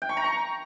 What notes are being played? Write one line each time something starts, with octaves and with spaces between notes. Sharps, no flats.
G5
C#6
A#5
C#6